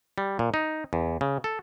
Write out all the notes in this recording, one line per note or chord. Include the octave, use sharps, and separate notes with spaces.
G3
A#2
D#4
E2
C#3
A4